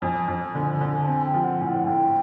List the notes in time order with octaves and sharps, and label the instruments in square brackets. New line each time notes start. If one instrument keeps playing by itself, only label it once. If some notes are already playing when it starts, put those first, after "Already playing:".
[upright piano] F2 [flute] G#5
[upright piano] F2
D3
D3
[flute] A5
[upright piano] C4 [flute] G#5
[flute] G5
[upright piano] F3
[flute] F#5
[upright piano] A2 [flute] G#5
[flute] G5
F#5
[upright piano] A2 [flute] G5